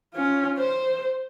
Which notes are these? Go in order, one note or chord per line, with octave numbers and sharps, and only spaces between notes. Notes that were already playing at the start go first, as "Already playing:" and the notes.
C#4 F4
C5